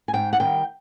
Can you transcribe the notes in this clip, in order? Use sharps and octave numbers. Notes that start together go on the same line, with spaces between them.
G#5
G#2 G5
F#5
D#3 G3 G5